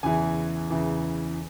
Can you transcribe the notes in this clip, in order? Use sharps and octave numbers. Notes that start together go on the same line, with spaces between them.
E2 C#3 E3 G#5
E2 C#3 E3